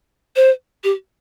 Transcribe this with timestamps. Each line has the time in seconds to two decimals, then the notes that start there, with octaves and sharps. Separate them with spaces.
0.36 C5
0.84 G4